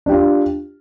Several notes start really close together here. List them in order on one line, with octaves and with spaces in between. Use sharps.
D4 G4 F4